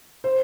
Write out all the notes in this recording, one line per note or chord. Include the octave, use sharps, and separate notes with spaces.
C5